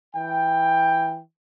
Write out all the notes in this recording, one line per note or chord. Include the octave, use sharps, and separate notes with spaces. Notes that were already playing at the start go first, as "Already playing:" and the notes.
E3 G5